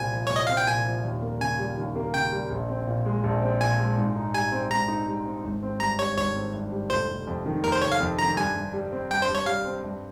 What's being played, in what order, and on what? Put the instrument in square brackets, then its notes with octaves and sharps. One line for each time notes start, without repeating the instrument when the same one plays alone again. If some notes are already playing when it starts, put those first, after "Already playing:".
Already playing: [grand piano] C2 A#2 C4 [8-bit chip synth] G#5
[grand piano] F3
[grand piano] C2 [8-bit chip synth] C#5
[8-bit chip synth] D#5
[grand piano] C4 [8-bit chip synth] F5
[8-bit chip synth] G5
[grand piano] A#2 [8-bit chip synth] G#5
[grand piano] F3
D#2
A#3
[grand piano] C#3 [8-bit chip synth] G#5
[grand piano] G3
D#2
A#3
[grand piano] C#3 [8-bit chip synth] G5
[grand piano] G3
A#1
C4
A#2
G#3
A#1
C4
[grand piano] A#2 [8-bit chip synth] G#5
[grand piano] G#3
G#2
D#4
[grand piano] G3 [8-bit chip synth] G#5
[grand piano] C4
[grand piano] G#2 [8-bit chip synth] A#5
[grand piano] D#4
G3
C4
G#1
C4
[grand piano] G2 [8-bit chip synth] A#5
[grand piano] G3 [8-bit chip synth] C#5
[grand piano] G#1 [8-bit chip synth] C#5
[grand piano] C4
G2
G3
[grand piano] F1 [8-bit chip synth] C5
[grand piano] F1
F2
D#3
[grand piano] F1 [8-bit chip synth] A#4
[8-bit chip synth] C5
[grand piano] F1 [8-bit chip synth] C#5
[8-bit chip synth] F5
[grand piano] F2
[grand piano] D#3 [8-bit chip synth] A#5
[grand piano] G2 [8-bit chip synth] G#5
[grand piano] G2
G3
C4
[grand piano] G2 [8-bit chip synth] G5
[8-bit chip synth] C5
[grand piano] G2
[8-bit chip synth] C#5
[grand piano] G3 [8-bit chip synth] F5
[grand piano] C4
G2